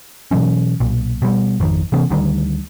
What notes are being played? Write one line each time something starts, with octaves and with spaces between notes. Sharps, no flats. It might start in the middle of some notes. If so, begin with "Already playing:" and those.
B2 E3 F#3 C#4
B1 A#2
B2 G3
G#1 F2 D#3
C3 E3 B3 C#4
D2 D3 D#3 G3